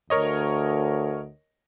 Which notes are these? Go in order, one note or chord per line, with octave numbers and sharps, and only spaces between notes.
D2 A#4 C#5 D#5